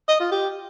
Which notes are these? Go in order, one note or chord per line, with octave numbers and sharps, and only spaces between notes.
D#5
F4
G4